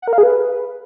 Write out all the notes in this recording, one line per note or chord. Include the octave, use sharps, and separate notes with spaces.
F#5
A#4
F5
G#4
B4